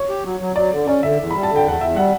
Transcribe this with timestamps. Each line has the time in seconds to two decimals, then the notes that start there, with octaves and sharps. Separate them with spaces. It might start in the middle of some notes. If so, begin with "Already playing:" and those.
Already playing: C#5
0.09 G4
0.25 F#3
0.40 F#3
0.56 F#3 D5
0.72 D3
0.87 C#4 D5
1.03 D3 E5
1.18 E2
1.31 G3 B5
1.43 A5
1.50 D3
1.56 G5
1.65 E2 F#5
1.80 E2 E5
1.96 G3 F#5